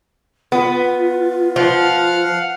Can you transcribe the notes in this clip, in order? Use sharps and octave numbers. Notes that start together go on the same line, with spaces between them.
B3 F4
F3 F5 F#5 F6